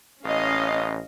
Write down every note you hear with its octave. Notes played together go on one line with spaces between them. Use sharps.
A1 C#4 D#5 F5